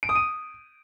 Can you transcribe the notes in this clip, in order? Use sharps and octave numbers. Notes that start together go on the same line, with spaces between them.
D7
D#6
D#7